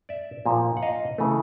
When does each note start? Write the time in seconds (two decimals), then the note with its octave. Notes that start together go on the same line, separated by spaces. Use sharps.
0.09 D5 E5
0.46 A#2 F3 A#3
0.77 F#5
0.82 D#5 F5
1.18 C#3 E3 A3